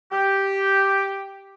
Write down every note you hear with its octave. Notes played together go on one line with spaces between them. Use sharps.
G4